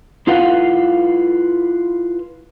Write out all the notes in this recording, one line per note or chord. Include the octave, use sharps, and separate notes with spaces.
E4 F4 A4 B4 F5 F#5